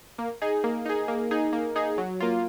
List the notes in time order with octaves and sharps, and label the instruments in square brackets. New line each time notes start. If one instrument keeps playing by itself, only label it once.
[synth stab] A#3
D#4 G#4
A#3
D#4 G#4
A#3
D#4 G#4
A#3
D#4 G#4
F#3
A#3 F4